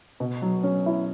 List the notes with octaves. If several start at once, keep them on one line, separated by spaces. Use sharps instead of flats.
B2
F#3
C#4
E4